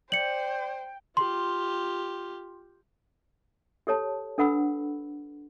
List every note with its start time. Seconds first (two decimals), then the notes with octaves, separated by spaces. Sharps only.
0.12 C5 D5 G5 G6 C#7 F#7
1.17 F4 G4 C6
3.87 G4 A4 C#5 A5
4.38 D4 A4 B4 F#5 B5 E6